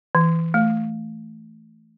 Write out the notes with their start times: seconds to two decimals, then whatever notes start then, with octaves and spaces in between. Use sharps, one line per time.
0.15 E3
0.54 A3